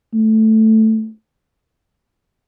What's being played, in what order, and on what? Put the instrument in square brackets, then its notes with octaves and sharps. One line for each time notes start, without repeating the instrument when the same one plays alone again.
[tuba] A3